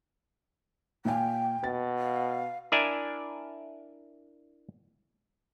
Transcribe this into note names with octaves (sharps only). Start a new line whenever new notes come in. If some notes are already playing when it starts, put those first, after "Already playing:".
A#2 F5 G5 G#5
B2 A6
F5
D4 E4 A#4 D5 E5 G#5